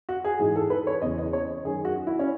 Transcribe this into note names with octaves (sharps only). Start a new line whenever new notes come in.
F#4
G#4
G#2 E3 G#4
A4
B4
C#5
E2 C#3 E3 D#5
D#5
C#5
F#2 D#3 G#4
F#4
E4
C#4